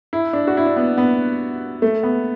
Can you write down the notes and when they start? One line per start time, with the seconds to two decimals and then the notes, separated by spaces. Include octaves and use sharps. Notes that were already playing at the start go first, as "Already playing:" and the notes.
0.13 E4
0.33 D4
0.47 F#4
0.57 E4
0.67 D4
0.77 B3
0.98 B3
1.82 A3
2.03 B3